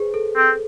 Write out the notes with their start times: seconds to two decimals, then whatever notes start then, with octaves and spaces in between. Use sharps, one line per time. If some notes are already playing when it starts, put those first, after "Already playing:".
Already playing: G#4 B4 C5
0.14 A4
0.36 C4 A4